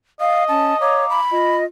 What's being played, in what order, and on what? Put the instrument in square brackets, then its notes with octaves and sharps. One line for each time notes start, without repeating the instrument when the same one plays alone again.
[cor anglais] D#5 [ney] F5
[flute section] C#4 [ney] A5
[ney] C#5 [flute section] F5 A#5 D6
[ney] B5
[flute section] F4 D#5